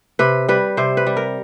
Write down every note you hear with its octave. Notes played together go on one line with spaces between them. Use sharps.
C3 B4
G3 B4
C3 C5
B4
G3
A#4